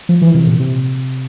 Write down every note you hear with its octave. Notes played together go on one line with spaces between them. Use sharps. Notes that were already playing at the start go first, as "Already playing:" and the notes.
F3
E3
C3
A#2
C3